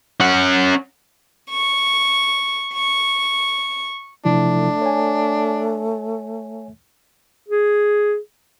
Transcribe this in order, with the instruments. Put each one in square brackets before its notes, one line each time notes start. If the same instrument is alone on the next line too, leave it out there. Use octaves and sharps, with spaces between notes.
[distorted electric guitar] C#4 F#5
[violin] C#6
C#6
[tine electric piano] C3 F3 E4 [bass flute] A3 [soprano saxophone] D4
[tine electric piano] C#5 G#5
[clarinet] G#4